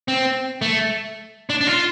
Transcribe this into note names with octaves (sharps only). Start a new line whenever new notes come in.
C4
A3
D4
D4
F4